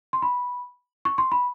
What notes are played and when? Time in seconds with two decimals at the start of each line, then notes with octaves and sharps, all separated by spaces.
0.13 C6
0.22 B5
1.05 C#6
1.18 C6
1.32 B5